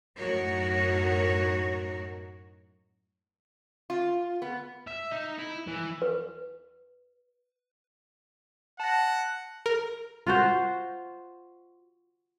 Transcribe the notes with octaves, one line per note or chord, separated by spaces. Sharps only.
F#2 A2 D#4 F#4 A#4 C#5
F4
B3
E5
D#4
E4
E3
B4
F#5 A5 A#6
A#4
F4 F#4 C5